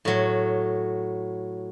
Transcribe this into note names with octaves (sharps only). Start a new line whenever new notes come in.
A2 F#3